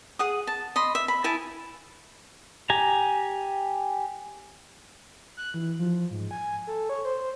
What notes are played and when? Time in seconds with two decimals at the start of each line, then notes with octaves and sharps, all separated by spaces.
0.19 G#4 F#5 D#6
0.47 A5
0.76 D#5 B5 C6
0.95 E5
1.08 B5
1.24 E4 G#5 A5 B5
2.70 G4 G#5 A#5
5.37 F#6
5.54 E3
5.79 F3
6.11 G#2
6.31 G#5
6.67 A4
6.89 C#5
7.05 C5